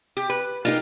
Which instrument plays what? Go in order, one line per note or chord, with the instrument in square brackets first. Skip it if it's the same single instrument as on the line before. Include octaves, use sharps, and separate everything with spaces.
[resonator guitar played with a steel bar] G4
B4
[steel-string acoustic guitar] A#3 D#4 G4 [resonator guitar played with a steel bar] F4